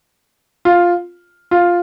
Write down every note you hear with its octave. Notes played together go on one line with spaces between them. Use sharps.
F4
F4